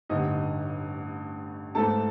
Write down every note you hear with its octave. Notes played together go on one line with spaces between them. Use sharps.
A1 G2 D3 D#4 D#5
G#2 E3 A3 A4 A5